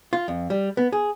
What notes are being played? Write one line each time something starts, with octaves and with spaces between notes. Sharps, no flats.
F4
F2
G3
B3
G#4